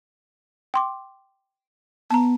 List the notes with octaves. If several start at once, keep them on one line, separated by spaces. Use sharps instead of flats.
G5 C6 D6
B3 A5 A#5